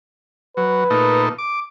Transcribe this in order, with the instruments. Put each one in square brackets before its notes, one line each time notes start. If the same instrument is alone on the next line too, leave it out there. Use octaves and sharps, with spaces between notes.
[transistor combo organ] F#3 [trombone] B4
[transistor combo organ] A#2 A3 D#4
D6